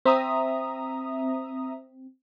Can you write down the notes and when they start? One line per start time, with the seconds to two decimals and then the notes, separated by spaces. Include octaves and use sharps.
0.06 C4 E5 A#5 D#6